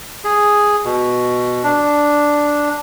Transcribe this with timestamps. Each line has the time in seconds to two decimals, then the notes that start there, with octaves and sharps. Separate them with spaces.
0.24 G#4
0.84 B2
1.64 D4